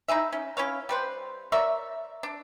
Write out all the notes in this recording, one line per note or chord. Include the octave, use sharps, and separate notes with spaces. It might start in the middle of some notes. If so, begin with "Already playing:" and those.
D#4 E4 G#4 E5
C#4
C#4 E4 C#5 F5
G3 B4 C5
A#4 C#5 D5 E5
D4